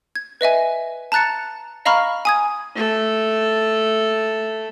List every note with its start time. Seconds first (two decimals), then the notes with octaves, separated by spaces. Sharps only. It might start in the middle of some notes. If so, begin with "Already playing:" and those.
0.15 G#6
0.41 B4 D#5 E5 G#5
1.12 A5 A#5 F#6 A6 C#7
1.85 D#5 F5 A#5 B5 C#6 F6
2.25 G#5 D#6 G#6
2.75 A3 A4